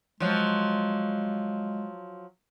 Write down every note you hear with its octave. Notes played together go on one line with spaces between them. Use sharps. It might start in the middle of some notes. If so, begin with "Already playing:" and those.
F3 F#3 G#3